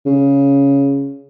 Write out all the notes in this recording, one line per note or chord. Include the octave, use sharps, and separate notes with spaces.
C#3